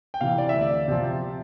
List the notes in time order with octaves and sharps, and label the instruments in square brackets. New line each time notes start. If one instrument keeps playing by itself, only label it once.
[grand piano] G5
C3 E3 F5
D5
D2 E5
D5
C3 F3